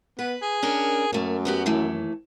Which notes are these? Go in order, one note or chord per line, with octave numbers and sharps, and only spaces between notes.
B3 B4
G#4
C#4 D4 A#4
F#2 A3 A#3
B3 F#4 G4
D#2 E3 A3